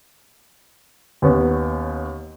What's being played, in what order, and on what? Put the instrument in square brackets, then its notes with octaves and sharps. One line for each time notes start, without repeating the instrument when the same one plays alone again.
[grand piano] D#2 B3 C#4